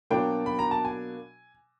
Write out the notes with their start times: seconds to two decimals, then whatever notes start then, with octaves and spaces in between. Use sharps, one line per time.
0.10 B2 F#3 A#3 D4 G5
0.46 B5
0.59 A#5
0.71 A5
0.85 G#5